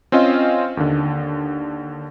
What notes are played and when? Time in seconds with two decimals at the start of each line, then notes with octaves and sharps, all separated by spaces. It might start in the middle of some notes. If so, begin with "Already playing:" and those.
0.12 C4 C#4 F4 D#5 F5
0.77 D#2 D3